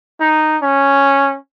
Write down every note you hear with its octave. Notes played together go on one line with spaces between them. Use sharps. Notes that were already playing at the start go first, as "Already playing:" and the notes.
D#4
C#4